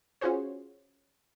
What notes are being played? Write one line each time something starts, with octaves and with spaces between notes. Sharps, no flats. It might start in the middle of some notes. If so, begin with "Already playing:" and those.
C#4 F4 F#4 G#4 C5 C#5